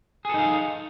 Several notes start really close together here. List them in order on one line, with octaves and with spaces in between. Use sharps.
G#4 A4 D#4 F5